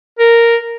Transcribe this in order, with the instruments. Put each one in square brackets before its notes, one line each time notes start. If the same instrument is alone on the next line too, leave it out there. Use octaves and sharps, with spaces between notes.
[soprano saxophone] A#4